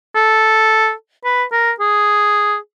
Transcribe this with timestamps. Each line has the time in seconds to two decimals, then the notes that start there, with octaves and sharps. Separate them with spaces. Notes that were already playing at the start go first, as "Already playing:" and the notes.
0.16 A4
1.25 B4
1.52 A#4
1.80 G#4